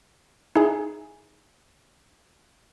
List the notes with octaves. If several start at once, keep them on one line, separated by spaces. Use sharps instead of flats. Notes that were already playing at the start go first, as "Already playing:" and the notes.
D#4 E4 G#4